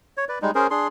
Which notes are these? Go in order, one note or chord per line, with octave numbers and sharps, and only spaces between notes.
C#5
B4 D5
G3 G#3 D#4
C#4 G#4 A#4 C5
D4 G#4 C6